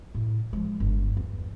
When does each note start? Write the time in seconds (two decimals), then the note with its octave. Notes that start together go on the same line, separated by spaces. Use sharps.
0.15 A2
0.53 F3 G#3
0.80 G1
1.17 E2